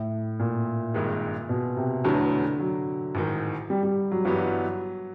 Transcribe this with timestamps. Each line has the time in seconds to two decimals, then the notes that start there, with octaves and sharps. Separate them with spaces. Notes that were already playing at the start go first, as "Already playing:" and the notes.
Already playing: A2
0.40 A#2
0.94 G#1 G2 D#3 G#3
1.49 B2
1.77 C3
2.04 F1 E2 B2 D3 F#3 A3
2.60 F#3
3.15 A1 G#2 D#3
3.70 G3
3.83 G3
4.11 F#3
4.25 G1 G2 E3 F#3 G3 B3